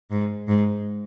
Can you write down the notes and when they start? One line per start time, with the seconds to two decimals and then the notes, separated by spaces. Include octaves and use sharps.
0.11 G#2
0.48 G#2